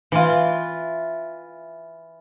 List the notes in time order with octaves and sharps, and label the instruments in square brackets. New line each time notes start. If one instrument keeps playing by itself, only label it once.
[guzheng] E3 F4